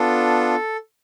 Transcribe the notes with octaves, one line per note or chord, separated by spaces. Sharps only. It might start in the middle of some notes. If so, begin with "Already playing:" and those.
Already playing: B3 D4 F4 A4